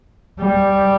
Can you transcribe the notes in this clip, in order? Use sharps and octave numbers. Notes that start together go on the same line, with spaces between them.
G3